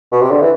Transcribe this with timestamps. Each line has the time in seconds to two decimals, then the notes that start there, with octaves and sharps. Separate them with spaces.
0.12 B2
0.21 C3
0.31 D3
0.41 E3